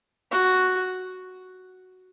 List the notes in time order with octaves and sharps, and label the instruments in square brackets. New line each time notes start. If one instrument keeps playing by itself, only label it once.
[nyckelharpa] F#4